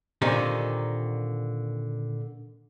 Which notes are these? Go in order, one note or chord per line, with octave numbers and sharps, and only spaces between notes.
A#2 D3 D#3 C4 D#4 G4